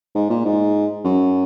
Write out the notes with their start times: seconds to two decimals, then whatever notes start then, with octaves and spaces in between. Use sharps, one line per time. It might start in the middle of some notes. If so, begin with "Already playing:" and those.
0.15 G#2
0.30 A#2
0.45 G#2
1.05 F#2